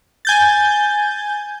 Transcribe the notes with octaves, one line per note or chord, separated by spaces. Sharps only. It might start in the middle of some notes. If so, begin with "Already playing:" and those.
G#5 G6 A6